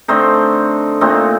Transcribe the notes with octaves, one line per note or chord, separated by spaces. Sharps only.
D3 A3 C4 D#4 C5
A#2 A3 C4 D#4